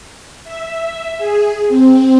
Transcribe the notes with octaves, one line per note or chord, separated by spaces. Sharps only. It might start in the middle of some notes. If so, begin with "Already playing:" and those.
E5
G#4
C4